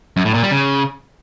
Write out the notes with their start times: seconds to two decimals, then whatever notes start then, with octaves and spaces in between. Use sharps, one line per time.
0.17 F#2
0.25 A2
0.34 A#2
0.43 G3
0.51 C#3